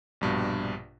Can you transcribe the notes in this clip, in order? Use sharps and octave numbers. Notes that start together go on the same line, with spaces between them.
A#1 G2 B2